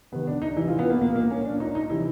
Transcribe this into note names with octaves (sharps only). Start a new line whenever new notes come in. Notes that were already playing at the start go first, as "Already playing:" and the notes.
C3 D#3 B3
D4
D#4
C3 E3 E4
F4
B3
A#3
A#2 A#3
A#3
C#4
A#2 D4
D#4
D#4
C3 E3 E4